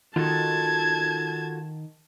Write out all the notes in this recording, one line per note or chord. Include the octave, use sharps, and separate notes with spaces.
D#3 F4 F#4 A4 A5 G#6